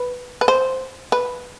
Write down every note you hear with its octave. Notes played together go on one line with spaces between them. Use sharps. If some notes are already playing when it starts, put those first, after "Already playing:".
Already playing: B4
B4
C5
B4